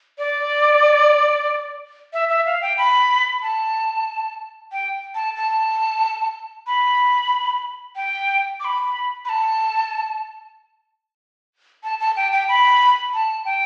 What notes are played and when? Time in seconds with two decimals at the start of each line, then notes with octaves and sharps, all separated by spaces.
0.18 D5
2.13 E5
2.30 E5
2.46 F5
2.62 G5
2.78 B5
3.42 A5
4.72 G5
5.15 A5
5.36 A5
6.67 B5
7.96 G5
8.60 D6
8.65 B5
9.25 B5
9.29 A5
11.84 A5
12.00 A5
12.16 G5
12.32 G5
12.49 B5
13.14 A5
13.45 G5